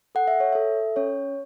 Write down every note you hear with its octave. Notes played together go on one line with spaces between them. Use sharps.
A4 F#5
E5
C#5
A4 E5
C#4 C#5